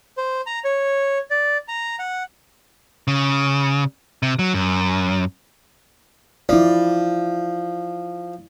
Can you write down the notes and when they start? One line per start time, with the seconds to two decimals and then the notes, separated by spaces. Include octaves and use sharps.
0.17 C5
0.46 A#5
0.64 C#5
1.31 D5
1.68 A#5
1.99 F#5
3.08 C#3
4.23 C3
4.39 F#3
4.54 F#2
6.49 F3 E4 D5